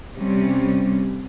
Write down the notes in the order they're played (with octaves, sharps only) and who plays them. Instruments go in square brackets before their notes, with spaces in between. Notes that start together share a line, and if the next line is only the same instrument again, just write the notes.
[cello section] C3 G3 C#4